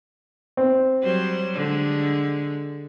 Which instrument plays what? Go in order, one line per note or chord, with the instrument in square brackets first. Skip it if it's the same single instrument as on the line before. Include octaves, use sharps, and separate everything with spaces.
[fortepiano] C4
[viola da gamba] F#3 G3 C5
D3 G#3